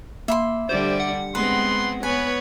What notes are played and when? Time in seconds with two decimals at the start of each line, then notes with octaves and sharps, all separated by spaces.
0.28 A#3 E5 B5 C6
0.69 D3 G3 G4 C5 D5
1.00 F#5
1.35 G#3 B3 C4 B4 C6
2.03 B3 B4 C#5 G#5